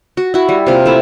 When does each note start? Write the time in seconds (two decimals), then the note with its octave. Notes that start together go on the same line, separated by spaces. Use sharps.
0.17 F#4
0.34 E4 F#4
0.49 G3
0.67 C3 A#3 F4
0.86 A3 E4